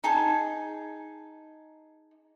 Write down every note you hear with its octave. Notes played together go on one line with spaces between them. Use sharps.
D#4 G#4 A5